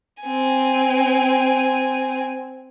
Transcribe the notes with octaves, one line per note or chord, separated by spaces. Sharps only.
C4 G#5